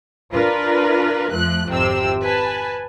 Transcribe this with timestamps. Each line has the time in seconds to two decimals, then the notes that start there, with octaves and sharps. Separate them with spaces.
0.33 D4 F4 A#4 B4
1.31 F2 F3 A3 F#6
1.68 G#1 F2 C3 C4 E6
2.22 B4 G#5 A5